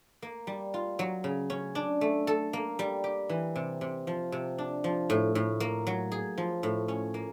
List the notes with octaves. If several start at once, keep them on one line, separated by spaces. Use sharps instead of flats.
A#3
G3
F4
F#3
C#3
C#4
D4
A3
A4
A#3
G3
G4
E3
C3
C3
F3
C3
D4
F3
A2
A2
A#3
F#3
G#4
F3
A2
C#4
A#3